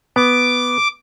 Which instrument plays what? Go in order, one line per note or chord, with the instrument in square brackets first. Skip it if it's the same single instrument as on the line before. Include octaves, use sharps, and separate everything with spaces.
[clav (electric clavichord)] B3 [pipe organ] D6